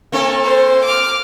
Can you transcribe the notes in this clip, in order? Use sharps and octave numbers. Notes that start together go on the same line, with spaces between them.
A#3 C4 A4
C5
D6 F6